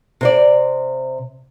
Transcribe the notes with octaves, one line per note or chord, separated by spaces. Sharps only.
C3 C5 D5